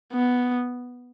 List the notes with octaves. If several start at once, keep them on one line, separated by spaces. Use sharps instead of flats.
B3